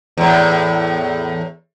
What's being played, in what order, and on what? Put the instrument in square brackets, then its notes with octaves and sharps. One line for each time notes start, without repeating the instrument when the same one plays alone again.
[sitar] E2 A2